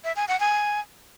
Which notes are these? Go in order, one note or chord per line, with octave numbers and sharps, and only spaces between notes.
E5
G#5
F#5
G#5